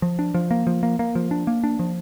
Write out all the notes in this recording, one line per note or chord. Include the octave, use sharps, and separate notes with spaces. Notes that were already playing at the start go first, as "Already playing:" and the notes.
F3
D4
F3
A#3
F3
A#3
A#3
F3
D4
A#3
D4
F3